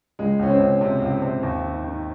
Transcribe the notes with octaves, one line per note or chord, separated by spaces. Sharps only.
C#2 G#3
C#2 C#4
C4
C#2
C3
C#2
C3
D#2
D#3
D#3